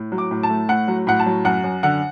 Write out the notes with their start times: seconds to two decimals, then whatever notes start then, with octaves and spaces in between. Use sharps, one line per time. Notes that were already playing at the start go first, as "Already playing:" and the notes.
Already playing: A2
0.12 F#3
0.18 D6
0.31 A2
0.43 A5
0.50 A3
0.69 A2 F#5
0.88 F#3
1.07 A2 F#5
1.20 A5
1.26 F#3
1.45 F#2 F#5
1.64 F#2
1.83 D3 F#5